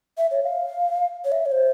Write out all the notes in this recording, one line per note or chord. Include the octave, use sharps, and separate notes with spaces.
E5
C#5
F5
C#5
E5
C#5
C5